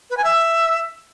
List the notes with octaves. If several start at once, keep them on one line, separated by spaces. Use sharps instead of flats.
B4
G#5
E5